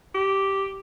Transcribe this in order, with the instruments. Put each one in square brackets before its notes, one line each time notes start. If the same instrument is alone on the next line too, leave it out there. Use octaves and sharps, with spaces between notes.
[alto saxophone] G4